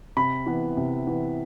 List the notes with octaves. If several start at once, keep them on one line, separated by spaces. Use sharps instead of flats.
C3 B5
E3 B3
C3
E3 B3